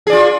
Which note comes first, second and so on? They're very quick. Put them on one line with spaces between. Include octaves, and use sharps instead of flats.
G#4 D5 F4